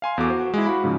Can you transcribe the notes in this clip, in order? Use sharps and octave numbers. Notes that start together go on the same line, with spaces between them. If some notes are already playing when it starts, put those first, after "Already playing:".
F5 G#5 C6
E2 B3 F#4 A4 D6
F#4 C5
G#3 E4
F#4 F5 B5
G#2 C#3 F3